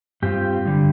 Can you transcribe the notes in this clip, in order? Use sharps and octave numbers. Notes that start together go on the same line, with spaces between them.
G2 G3 C4 F4 G4
G2 D3 G3